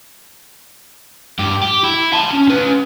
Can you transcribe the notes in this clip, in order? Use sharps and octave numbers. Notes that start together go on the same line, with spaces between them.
G2 G4
G4
E4
A5 C6
C#4
C#4 B4